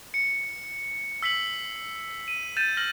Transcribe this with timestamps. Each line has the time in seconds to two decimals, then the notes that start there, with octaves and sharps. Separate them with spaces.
0.14 C#7
1.22 E6 B6 C7 F#7
2.28 D#7
2.57 G6 A6 D#7 E7
2.77 F6 A#6 F#7